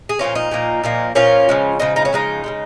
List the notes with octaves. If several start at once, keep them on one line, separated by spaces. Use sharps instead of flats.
G#4
A#2 F3 A#3 C#4 F4
D#4
A#2 F3 A#3
A#2 F3 A#3
A#2 F3 A#3 C#4 F4
C#3 F3 G#3
C#3 F3 G#3 D#4
D#4
C#4
C#3 F3 G#3 D#4
C#3 F3 G#3